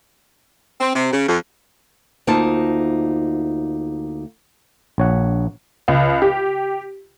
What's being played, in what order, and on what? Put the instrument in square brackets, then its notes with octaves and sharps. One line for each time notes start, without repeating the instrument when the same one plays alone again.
[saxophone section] C4
C3
C#3
F2
[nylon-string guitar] D2 A#3 D#4 F4 C5 A5
[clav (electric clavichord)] A#1 C#5 F#5
[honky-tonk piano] C#2
G4